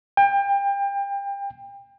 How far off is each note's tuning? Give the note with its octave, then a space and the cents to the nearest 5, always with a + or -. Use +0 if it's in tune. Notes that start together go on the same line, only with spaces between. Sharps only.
G5 +30